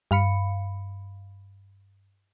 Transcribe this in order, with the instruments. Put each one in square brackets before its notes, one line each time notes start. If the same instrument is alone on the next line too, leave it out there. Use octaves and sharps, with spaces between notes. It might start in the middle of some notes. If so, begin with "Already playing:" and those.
[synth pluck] G2 F5 B5 C#7